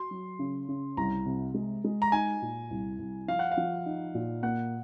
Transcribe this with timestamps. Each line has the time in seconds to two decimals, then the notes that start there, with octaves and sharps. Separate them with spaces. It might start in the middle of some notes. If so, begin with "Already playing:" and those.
Already playing: F#4 C6
0.11 F#3
0.39 C#3
0.68 C#3
0.97 C2 A#5
1.26 C3
1.54 G#3
1.84 G#3
2.02 A#5
2.12 D#4 G#5
2.42 A#2
2.70 C2
2.99 C2
3.28 F3 F5
3.39 F#5
3.51 F5
3.57 F3
3.86 D#4
4.15 A#2
4.43 A#3 F#5